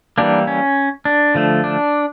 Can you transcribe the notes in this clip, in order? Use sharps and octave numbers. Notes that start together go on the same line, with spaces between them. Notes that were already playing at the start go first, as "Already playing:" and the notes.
E3 G3 A#3 D4
C#4
D4
D3 F3 A3
D4